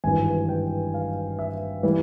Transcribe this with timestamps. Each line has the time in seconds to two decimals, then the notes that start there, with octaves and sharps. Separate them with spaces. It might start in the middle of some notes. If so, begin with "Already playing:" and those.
0.04 G#1 G2 E3 G#5
0.49 G5
0.94 F5
1.39 E5
1.83 E3 G3